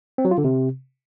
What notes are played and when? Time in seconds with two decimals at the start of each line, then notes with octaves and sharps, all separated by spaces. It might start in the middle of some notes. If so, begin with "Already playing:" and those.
0.18 C4
0.25 F#3
0.31 F4
0.38 D3
0.44 C3